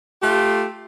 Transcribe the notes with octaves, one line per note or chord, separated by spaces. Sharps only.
A3 F4 G4